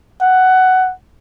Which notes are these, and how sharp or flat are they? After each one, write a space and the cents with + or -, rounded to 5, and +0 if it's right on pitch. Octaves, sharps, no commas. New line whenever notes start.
F#5 +10